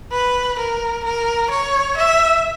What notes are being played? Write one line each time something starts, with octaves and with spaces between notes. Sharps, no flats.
B4
A#4
A#4
C#5
E5